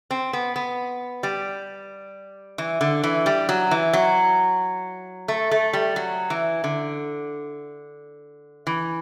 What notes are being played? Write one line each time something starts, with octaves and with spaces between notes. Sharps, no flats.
C4
B3
B3
G3
E3
D3
E3
G3
F#3
E3
F#3
A3
A3
G3
F#3
E3
D3
E3